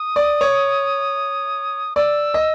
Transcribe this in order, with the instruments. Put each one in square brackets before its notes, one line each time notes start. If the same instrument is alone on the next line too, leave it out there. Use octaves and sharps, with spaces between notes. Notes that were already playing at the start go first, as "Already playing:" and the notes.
Already playing: [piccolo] D#6
[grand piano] D5
C#5
[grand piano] D5 [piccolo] E6
[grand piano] D#5